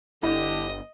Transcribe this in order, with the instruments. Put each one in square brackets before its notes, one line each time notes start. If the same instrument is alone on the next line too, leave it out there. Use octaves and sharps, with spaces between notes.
[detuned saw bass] G1 [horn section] D3 G4 [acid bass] E4 [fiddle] D#5